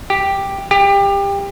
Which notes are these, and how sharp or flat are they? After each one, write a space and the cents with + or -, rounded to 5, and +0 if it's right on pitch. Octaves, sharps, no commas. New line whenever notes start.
G4 +5
G4 +25